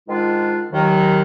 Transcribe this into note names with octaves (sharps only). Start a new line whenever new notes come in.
G#2 D#3 G#3 D4 F4
D#2 D#3 F#3